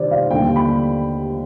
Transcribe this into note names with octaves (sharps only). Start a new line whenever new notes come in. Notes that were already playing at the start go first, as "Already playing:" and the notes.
Already playing: C3 D#3 G3 D4 C5 D5
F5
D#2 D3 G3 G5
B5